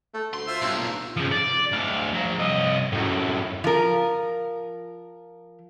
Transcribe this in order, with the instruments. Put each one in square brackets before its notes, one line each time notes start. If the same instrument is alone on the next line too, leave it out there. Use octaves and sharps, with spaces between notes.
[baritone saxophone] A3
[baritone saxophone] D2 [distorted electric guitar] C6
[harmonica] F4 C5 E5
[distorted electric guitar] B1 [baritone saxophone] G2
[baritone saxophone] A#2
[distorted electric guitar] C#3 F3
D5
D2 F5
F3 A#5
C2 D#5
F#2 A2
[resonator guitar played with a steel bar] F3 A#4